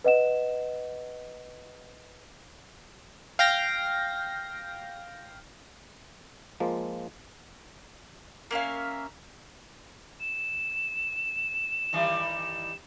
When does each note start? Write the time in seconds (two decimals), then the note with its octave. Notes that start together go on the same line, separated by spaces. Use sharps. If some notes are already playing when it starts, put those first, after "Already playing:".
0.04 B4 D#5 F#5 E7
3.39 F5 G5 A#6
6.60 F3 G#3 A#3
8.51 A#3 C#4 E5 F5
10.20 E7
11.93 D#3 E3 G3